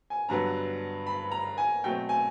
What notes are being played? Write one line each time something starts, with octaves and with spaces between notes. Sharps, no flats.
G#5
G2 D3 F#3 B3 A#5
B5
A#5
G#5
B2 F#3 A3 C4 G5
G#5